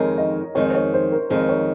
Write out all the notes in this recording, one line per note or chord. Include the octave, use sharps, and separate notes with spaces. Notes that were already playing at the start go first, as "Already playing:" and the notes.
Already playing: F2 D#3 G#3 A#4 C#5
D#5
F2 D#3 G#3 C#5
C5
C#5
C5
A#4
F2 D#3 G#3 C5
C#5